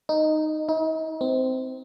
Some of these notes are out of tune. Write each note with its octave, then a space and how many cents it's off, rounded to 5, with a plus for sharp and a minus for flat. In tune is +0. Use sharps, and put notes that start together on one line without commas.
D#4 -5
D#4 +40
C4 -15